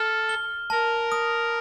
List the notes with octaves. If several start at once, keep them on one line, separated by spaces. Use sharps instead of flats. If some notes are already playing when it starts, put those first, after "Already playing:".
Already playing: A4 F6
G7
A#4 A5
D#6